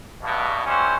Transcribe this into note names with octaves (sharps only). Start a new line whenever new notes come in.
E2 G2 B2
D3 G3 C#4 E4 F#4 C5